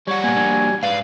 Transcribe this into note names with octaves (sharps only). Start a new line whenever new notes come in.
G3 F#4 C#5
A#2 A#3 B3 G#5
A#3 D4
G#2 B4 D5 F5